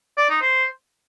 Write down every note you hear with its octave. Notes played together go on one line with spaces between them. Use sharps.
D5
D#4
C5